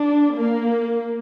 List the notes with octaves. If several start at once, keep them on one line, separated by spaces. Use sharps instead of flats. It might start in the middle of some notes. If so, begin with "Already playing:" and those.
Already playing: D4
A#3